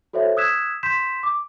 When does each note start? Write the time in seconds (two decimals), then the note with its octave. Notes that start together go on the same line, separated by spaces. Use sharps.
0.13 F#4 A4 C5 C#5 E5
0.37 D#6 E6 F#6 G#6 B6 E7
0.83 C6 G6 B6 E7
1.23 D6